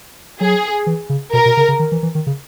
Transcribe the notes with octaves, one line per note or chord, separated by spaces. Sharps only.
F#3 G#4
E3
C#3
B2 A#4
B2
C#3
C#3
D#3
E3
E3
D#3
C#3